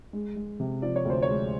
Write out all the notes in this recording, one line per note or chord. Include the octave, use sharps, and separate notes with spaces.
G#3
G#3
C3
F3 D5
C#5
D2 C5
C#5
G#3